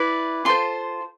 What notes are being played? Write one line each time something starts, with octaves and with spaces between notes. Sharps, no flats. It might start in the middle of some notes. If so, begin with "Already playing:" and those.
Already playing: E4 B4 D5
F4 A4 C5 C6